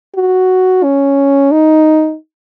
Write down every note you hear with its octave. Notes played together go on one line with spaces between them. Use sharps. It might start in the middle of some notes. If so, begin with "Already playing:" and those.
F#4
C#4
D#4